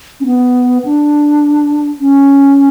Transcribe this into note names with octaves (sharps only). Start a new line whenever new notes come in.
C#4
B3
D4
C#4